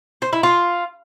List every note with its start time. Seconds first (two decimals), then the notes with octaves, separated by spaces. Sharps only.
0.22 C5
0.33 E4
0.43 F4